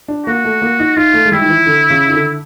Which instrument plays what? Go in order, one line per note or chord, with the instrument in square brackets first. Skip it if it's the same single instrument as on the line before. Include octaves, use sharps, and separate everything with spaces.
[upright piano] D4
[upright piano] A#3 [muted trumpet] F#4
[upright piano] A3
A#3
D#4
[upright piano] D#4 [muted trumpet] F4
[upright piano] A3
G#3
[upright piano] G3 [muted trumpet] E4
[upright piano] D#3
E3
D3
C#3
D#3
D3